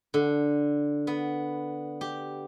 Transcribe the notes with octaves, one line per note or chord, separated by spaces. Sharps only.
D3
B3
G4